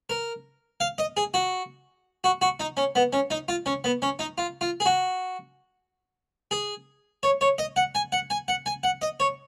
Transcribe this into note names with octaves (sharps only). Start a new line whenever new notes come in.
A#4
F5
D#5
G#4
F#4
F#4
F#4
D#4
C#4
B3
C#4
D#4
F4
C#4
B3
C#4
D#4
F4
F4
G#4
F#4
G#4
C#5
C#5
D#5
F#5
G#5
F#5
G#5
F#5
G#5
F#5
D#5
C#5